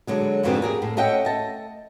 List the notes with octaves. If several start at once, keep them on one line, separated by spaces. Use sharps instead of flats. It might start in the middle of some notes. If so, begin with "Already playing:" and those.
D3 F#3 G#3
F2 G#2 B2 D3 E3 C4
G4 G#4 A#4
A2
A3 C#4 D#5 E5 F#5 G5
D#5 A5